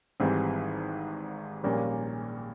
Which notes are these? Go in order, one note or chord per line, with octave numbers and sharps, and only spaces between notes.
G#1 G#2 E3 G3 C4
A#1 A#2 G3 A#3 C#4